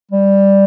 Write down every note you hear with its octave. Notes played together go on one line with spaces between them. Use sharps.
G3